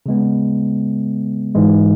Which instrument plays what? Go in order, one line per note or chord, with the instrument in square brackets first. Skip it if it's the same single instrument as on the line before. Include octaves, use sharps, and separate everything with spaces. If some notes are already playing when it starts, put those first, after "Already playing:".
[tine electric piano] C#3 G#3 B3
G#2 E3 G#3